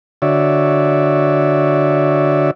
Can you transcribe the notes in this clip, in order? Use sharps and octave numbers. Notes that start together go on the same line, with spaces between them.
D3 F#4 C#5 D5 E5